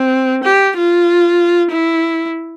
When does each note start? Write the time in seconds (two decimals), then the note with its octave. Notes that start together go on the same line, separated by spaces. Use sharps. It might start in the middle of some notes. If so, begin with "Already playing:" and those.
Already playing: C4
0.44 G4
0.77 F4
1.71 E4